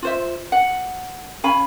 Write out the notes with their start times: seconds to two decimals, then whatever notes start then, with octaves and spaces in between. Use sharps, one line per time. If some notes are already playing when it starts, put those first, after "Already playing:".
0.02 F4 C5 E5
0.52 F#5
1.44 C#4 F5 G#5 B5